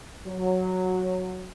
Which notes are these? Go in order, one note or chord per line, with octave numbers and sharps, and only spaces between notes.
F#3